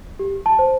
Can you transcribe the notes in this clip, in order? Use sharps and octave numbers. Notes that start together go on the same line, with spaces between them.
G4
A5
C5